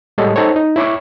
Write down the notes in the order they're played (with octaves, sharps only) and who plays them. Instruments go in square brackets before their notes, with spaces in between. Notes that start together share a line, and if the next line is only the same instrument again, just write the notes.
[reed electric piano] A2 G3 G#3 A4 C#5 D#5
D#4 A4 C5 C#5
D#4
E4 C#5 C#6 D6